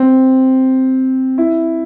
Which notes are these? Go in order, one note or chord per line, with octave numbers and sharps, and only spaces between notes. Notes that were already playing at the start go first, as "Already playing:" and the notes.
Already playing: C4
E4